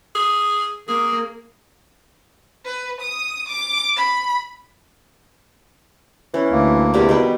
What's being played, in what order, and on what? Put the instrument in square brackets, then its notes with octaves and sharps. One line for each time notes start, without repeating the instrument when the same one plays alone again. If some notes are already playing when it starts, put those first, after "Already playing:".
[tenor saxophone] G#4
[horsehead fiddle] A#3 [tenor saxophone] G#4
[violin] B4
D#6
D6
B5
[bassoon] E3 [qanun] C#4
[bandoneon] D2 A#3
[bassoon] E2 [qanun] C3 G3 A#4
[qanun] B2 D#3 B4